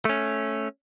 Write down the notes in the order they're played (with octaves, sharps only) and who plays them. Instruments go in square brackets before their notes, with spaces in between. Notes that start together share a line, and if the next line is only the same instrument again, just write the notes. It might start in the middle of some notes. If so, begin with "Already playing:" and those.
[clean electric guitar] A3 C#4